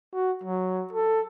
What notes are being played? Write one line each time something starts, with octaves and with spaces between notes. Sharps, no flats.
F#4
F#3
A4